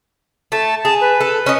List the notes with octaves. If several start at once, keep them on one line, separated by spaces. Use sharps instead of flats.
A3 A5
G#4 A5
B4
A4
C#4 D#5